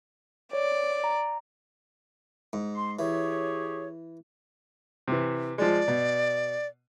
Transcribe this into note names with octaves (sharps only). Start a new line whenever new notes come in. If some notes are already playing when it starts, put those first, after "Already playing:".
C#5 D5
A#5
G#2
C6
E3 G4 G#4 C#5
C3 E3
F3 G#3 D5
B2